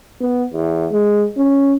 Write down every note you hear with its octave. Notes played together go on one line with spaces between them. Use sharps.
B3
E2
G#3
C#4